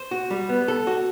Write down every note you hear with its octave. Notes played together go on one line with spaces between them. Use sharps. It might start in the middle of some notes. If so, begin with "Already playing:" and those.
Already playing: C5
F#4
G3
B3
A4
F#4